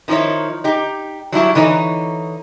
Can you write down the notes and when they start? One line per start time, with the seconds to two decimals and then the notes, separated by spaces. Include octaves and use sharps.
0.08 D#3 F3 D#4 E4 C#5
0.64 D#4 G4
1.32 F#3 G3 E4 A5
1.55 D3 E3 D#4 C#5